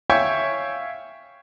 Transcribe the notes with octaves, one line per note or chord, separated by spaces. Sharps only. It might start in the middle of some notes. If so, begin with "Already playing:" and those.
C#5 E5 F5 G5 G#5 C#6